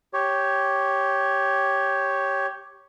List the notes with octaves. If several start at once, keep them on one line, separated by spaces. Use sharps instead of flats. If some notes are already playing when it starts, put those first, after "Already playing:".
G4 C#5